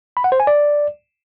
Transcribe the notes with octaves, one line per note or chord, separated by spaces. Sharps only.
B5
F#5
C5
G#5
D5